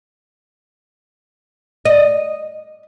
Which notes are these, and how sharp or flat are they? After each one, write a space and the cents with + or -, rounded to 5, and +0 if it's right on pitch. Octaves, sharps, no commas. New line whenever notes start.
D#5 -10